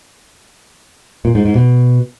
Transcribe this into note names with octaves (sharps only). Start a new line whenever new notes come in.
A#2
G#2
G#2
B2